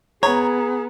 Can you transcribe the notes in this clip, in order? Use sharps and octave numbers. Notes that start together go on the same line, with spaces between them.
B3 G#4 C#5 A#5 G#6